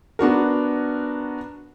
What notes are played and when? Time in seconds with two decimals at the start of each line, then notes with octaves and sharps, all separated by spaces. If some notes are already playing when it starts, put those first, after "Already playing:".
0.19 B3 D4 F#4 A#4